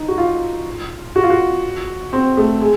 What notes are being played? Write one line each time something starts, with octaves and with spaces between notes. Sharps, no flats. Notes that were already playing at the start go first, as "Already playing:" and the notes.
Already playing: D#4
F#4
F4
F#4
F4
F#4
C4
A3
G#3